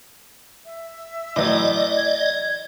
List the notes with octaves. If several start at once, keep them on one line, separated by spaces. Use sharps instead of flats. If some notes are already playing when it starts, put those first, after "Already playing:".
E5
A2 E3 F#3 D5 D#5
G#6